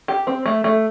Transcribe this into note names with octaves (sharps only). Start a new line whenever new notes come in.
G4
C4
A3
A3